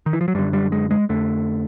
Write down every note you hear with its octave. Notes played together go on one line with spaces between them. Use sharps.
D#3
E3
F3
F#3
F#2 D3 G3
G3
G#3
G#3
F2 D3 A3